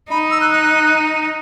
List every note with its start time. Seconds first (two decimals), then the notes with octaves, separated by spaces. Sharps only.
0.11 D#4 B5
0.31 E6
0.41 F#6
0.52 F#6